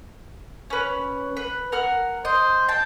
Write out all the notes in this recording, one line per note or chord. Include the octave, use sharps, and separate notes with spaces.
C#4 B4
B4
A#4 F#5 F6
C5 D#5
G5 A5